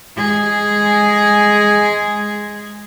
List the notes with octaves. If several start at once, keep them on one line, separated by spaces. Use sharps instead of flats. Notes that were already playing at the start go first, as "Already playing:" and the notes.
G#3 G#4